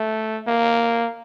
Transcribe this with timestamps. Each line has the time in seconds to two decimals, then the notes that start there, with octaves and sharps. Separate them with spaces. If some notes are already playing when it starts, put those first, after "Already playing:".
Already playing: A3
0.47 A#3